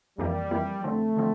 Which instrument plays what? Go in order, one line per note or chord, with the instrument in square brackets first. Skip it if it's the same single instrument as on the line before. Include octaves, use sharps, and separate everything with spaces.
[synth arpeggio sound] F2 E3 A#3 E4 G4 [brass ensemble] G3
[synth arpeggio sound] F2 E3 A#3 E4 G4
[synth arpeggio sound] D3 F3 C4 [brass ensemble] A3
[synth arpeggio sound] D3 F3 C4